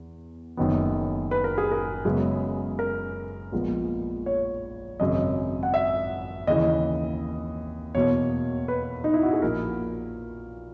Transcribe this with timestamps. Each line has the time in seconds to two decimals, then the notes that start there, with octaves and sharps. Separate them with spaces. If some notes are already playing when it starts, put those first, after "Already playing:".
Already playing: E2 B3
0.57 F#1 F#2 D#3 F#3 B3
1.31 B4
1.44 A#4
1.58 G#4
1.71 A#4
2.05 F#2 C#3 G#3 B3
2.79 A#4
3.52 A#1 A#2 G#3 B3
4.26 C#5
5.00 G#1 F#2 C#3 D#5
5.63 F#5
5.74 E5
6.47 D#2 C#3 E3 D#5
7.95 E2 B2 A#3 C#5
8.68 B4
9.04 D#4
9.14 E4
9.23 F#4
9.33 G#4
9.42 A#1 A#2 A#3 A#4